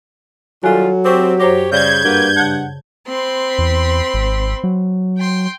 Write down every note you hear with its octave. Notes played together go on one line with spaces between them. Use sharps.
D#3 F#3 G3 F4 A4 G#5 F#6
C4 G4 C#6 D6
F#2 G4 C5 C#5 A#6
C#3 G3 G#4 D5 G6 G#6
G2 A#3 F#4 B4
C#3 F#5 A5
C4 B5 C6
E2
G#1
F#3
G5 C6